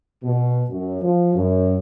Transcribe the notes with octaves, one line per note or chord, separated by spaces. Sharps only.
B2
F#2
F3
F#2